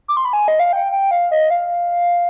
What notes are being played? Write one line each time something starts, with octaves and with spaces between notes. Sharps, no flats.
D6
C6
B5
G#5
D#5
F5
G5
G5
F5
D#5
F5